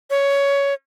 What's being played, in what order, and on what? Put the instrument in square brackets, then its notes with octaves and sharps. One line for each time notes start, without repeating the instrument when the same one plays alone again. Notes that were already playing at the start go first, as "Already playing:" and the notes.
[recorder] C#5